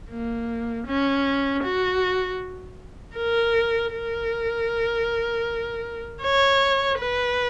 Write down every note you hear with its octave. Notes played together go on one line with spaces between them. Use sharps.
A#3
C#4
F#4
A#4
A#4
C#5
B4